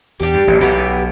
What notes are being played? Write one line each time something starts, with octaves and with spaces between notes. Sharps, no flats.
E2 G3 D4 G4
G2
A1 A2
B1 B2 E3 B3 G4